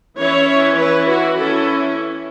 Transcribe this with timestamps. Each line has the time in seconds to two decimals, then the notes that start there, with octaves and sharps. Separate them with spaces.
0.17 E3 C#4 E4 C#5
0.76 E3 C#4 E4 B4
1.07 F#4
1.37 E3 C#4 E4 A4